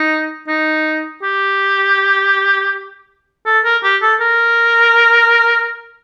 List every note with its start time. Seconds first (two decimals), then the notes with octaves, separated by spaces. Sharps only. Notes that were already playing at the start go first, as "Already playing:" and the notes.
Already playing: D#4
0.48 D#4
1.23 G4
3.46 A4
3.65 A#4
3.84 G4
4.02 A4
4.21 A#4